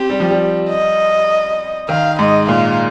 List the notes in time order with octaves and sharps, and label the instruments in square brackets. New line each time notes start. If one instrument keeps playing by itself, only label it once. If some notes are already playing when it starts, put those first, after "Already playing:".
Already playing: [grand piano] C4 [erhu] G4
[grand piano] G3
F3
G3
[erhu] D#5
[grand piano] D#3 [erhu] F5
[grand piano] G#2 [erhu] D#5
[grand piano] A#2 [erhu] F5